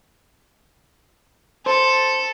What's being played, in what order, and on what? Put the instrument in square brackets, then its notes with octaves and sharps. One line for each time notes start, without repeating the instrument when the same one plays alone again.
[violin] A4 [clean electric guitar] C5